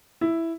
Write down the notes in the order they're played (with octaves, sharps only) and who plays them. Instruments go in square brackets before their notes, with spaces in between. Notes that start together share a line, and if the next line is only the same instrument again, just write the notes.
[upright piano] E4